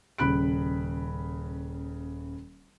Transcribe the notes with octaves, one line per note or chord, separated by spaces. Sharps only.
D#1 C#3 B5 F#6 D7